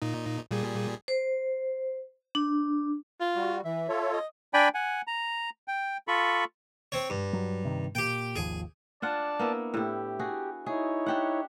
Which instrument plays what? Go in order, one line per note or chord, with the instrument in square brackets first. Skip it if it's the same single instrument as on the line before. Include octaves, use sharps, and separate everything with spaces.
[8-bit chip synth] A#2 D#4
A#2 G3 G#4
[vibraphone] C5
D4
[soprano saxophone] F4
[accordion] G3 F#4
[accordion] E3 [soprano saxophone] E5
[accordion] F4 A4 C#5
[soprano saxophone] D#5
[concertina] D4 D5 G5 G#5 B5
F#5 G#5
A#5
G5
F4 A4 B5 C#6
[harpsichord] C4 C#5
G2
[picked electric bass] F#3
C3 D#3
[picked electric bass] A#2 [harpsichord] G4 G5
[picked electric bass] G#1 D#2 F3 [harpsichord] G#4
[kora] D4 F4 F#5 [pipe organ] D5 A5
[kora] A#3 B3 E4
[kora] A2 E4 [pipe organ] G4
[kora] F#4 G#4
[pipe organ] D#4 E4 C#5 [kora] G#4
[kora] D4 G4 F#5